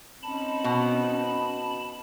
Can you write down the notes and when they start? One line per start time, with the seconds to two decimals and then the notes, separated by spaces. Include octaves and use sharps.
0.23 C4 C#4 D#4 A5 B5
0.64 B2